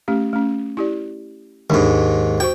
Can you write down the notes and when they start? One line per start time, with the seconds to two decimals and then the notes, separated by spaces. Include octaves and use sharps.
0.08 A3 C#4 G4
0.33 A3 C#4
0.77 E4 G4 D5
1.70 D#2 G#2 G#3 D4 D#4
2.40 F#4 C5 G5 C#6